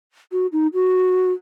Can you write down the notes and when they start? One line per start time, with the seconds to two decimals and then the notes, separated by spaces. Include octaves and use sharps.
0.32 F#4
0.53 D#4
0.74 F#4